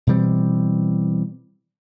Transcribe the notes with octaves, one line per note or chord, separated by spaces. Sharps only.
B2 E3 G3 C4